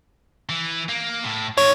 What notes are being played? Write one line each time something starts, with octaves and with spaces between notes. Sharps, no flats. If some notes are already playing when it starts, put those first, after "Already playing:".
E3
A#3
A2
G#2 D#3 C#5